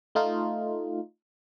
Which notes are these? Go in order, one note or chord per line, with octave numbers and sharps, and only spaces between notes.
A3 D#4 F4